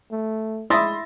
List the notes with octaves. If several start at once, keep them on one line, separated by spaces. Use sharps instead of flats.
A3
G#3 E4 E5 C6 D#6 A6 A#6